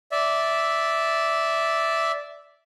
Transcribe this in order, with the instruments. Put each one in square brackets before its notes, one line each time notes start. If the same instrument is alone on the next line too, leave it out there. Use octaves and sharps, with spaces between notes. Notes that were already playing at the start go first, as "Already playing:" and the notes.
[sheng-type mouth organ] D5 E5